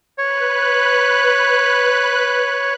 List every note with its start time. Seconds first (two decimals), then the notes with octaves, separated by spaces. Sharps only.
0.18 B4 C#5 F#6